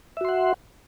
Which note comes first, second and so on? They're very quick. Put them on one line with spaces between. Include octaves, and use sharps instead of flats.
E5 F#4 C6 F#5